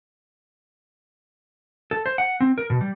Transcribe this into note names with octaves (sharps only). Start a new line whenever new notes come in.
A4
C5
F#5
C4
A#4
B2
G3